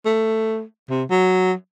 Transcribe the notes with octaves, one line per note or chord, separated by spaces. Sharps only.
A3
C3
F#3